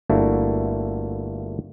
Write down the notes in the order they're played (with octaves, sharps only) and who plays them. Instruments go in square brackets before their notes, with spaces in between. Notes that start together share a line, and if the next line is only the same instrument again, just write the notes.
[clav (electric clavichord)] G1 A3 A#3 D4 E4 F#4